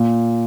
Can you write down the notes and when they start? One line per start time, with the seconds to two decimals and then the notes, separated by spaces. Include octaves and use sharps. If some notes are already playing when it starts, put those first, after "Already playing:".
Already playing: A#2